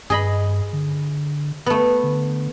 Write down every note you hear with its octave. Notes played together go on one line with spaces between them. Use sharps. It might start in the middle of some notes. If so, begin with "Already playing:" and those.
G2 G#4 D#5 B5
D3
A3 B3
D3